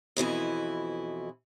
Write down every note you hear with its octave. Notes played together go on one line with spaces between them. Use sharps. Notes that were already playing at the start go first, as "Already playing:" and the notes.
F2 B2 E3 E4